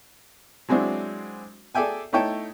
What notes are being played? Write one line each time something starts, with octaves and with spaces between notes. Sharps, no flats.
F#3 G#3 C4 D4 E4 F#4
G#4 A4 D5 E5 G5 G#5
A3 D#4 E4 C#5 G5 A5